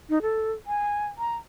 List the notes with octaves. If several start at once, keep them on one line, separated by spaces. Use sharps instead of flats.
D#4
A4
G#5
A#5